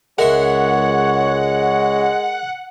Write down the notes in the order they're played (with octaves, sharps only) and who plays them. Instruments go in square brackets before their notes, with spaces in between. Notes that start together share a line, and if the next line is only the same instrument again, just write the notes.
[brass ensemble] C#2 C#5 [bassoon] G#3 [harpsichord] A#4 E5 C6 [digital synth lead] F#5